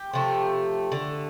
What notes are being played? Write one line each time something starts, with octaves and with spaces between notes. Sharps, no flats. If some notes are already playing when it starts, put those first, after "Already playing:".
Already playing: G4
C3 F3 A3
D3 A3